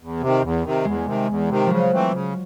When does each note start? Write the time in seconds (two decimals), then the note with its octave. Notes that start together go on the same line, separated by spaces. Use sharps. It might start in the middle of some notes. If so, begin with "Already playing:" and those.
0.01 E2
0.21 C3 D#3
0.42 E2
0.64 C3 D#3
0.85 E2 G#3
1.06 C3 D#3
1.28 E2
1.48 C3 D#3
1.66 C#3 F3 F#3
1.92 E3 A3 C4
2.12 C#3